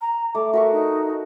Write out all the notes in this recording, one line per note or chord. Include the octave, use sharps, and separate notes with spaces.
A#5
A3 D6
F#4 A#4 E5 C#6
D#4